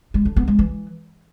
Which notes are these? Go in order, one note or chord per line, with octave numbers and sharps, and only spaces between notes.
G#3
D3
B3
G#3
E3